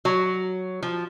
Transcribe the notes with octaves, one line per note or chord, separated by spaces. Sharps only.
F#3
F3